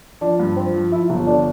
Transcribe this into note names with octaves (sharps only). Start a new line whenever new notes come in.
F3 D4
G2
F3 C4
F3
F3 E4
G1
D3 D4